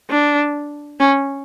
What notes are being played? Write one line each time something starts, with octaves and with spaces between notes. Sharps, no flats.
D4
C#4